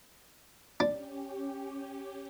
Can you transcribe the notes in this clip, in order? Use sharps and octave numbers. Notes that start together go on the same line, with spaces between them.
C#4 D4 G4